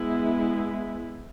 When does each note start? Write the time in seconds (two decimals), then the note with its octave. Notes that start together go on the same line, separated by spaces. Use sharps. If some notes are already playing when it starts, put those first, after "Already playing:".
Already playing: G#3 B3 E4